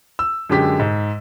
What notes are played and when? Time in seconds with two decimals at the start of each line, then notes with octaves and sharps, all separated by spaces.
0.19 E6
0.50 F#2 D3 G#3 G4 B6
0.79 G#2